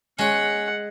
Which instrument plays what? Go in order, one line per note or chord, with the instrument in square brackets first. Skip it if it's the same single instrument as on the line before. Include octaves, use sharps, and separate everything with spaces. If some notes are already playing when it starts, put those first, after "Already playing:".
[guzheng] G#3 [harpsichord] C#4 C#5 [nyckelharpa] F#5